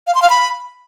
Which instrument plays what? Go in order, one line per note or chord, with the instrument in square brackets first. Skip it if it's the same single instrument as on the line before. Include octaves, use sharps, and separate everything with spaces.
[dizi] F5
C6
F5
B5